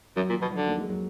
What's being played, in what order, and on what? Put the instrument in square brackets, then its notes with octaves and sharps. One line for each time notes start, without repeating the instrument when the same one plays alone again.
[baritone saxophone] F#2 [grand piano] F#3
[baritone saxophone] A#2
[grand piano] F3
[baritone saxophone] B2
[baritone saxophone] D3 [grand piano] F#3
[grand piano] A#3
G#3
F#3